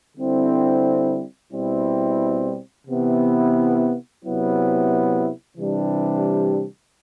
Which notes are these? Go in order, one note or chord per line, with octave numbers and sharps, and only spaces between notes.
D3 G3 C4 E4
B2 G3 C4 E4
C3 E3 B3 E4
C3 F#3 B3 E4
C3 E3 G3 D4